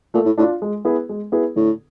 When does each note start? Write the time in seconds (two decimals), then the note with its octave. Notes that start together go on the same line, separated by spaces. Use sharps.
0.14 A#2 A3
0.26 A2
0.38 A2 D4
0.42 F4
0.62 G#3
0.85 B3 E4 G#4 B4
1.09 G#3
1.32 B3 E4 G#4 B4
1.56 A2 D3